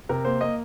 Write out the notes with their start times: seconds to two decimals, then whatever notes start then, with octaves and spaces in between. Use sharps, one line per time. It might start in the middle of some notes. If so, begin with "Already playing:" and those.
0.09 C3 A#4
0.25 A#3 C5
0.41 A#3 D#5